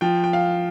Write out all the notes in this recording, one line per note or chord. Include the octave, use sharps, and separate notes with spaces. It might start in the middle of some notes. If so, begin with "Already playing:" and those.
F3 G5
G5
F5